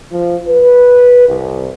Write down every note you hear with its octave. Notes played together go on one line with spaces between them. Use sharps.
F3
B4
C2